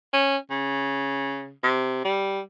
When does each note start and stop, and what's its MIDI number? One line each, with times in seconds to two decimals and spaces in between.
0.13 0.37 61
0.51 1.52 49
1.63 2.00 48
2.04 2.40 55